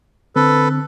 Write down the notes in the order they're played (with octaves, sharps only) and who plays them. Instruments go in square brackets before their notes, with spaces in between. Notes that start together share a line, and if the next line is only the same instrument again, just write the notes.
[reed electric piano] D3 C4 [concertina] A4 B4